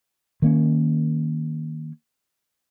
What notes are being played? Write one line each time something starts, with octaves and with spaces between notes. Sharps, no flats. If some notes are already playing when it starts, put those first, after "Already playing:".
D#3 A#3 C#4